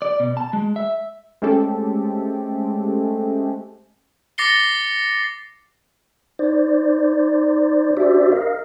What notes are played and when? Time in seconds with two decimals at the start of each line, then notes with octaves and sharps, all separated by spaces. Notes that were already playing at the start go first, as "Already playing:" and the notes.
0.02 D5
0.20 B2
0.37 A5
0.53 G#3
0.76 E5
1.42 G#3 A3 C4 C#4 G4 A4
4.38 D6 A6 A#6 C7 C#7 G7
6.39 D#4 C5 D5
7.97 D4 F#4 G4 C5 D5 E5
8.32 A#4 D#5 F5